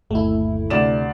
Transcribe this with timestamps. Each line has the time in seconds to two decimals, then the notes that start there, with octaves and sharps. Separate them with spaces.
0.11 G1 D#2 A3 E4
0.70 D2 C3 D5 E7